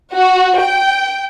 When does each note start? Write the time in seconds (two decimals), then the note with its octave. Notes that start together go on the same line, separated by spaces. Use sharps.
0.15 F#4
0.60 G5